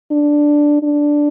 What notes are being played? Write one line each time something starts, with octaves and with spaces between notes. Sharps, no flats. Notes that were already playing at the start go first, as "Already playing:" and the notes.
D4
D4